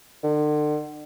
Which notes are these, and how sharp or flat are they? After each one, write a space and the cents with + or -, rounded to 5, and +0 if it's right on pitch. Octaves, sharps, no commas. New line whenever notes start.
D3 +40